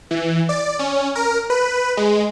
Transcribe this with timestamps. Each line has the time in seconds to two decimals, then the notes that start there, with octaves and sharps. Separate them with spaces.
0.11 E3
0.49 D5
0.79 C#4
1.15 A#4
1.50 B4
1.97 G#3